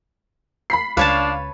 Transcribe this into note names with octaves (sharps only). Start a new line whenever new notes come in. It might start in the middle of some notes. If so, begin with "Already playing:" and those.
B5 B6 C7
C#2 D4 B4 C#5 F5 A5